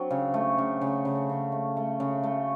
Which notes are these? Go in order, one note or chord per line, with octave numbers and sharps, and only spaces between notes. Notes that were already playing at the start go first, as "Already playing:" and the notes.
Already playing: F#3 C4 D4
C#3
A3
C#3
C#3
C#3
C#3
A3
A3
C#3
A3